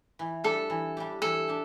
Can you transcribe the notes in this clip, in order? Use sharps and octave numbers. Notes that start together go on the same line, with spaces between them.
E3
G3 D4 G4 A4
E3
G3 D4 G4
E3 A4
D4 G4